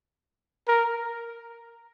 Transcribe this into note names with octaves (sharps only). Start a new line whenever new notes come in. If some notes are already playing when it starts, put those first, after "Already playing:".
A#4